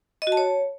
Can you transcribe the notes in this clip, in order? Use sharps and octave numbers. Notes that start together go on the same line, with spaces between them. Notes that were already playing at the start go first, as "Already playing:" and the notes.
D#5
F#4
A5
C#5